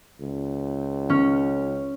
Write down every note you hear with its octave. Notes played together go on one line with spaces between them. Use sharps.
C#2
C#4